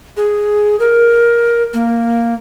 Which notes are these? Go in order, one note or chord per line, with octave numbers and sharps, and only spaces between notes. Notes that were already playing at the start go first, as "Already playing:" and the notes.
G#4
A#4
A#3